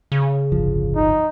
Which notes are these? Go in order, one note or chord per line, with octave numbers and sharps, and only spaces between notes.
C#3
D1 G1 F3
D#4